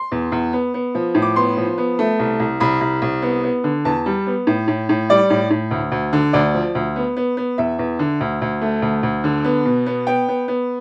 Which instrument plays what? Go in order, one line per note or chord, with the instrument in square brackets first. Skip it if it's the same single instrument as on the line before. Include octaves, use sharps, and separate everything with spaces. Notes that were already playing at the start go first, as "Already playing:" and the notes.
Already playing: [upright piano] C6
E2
E2
B3
B3
F3
A2
D6
B3 C6
F3
B3
A3
C2
C2
C2 B5
C2
C2
B3
B3
D3
E2 A5
G3
B3
A2
A2
A2
G3 D5
A2
A2
D2
D2
D3
D2 D5
F3
D2
B3
B3
B3
E2 E5
E2
D3
D2
D2
A3
D2
D2
D3
B3
B2
B3
B3 G5
B3
B3